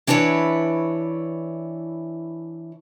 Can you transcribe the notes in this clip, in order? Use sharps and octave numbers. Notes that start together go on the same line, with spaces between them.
E3 D4 E4 B4 C#5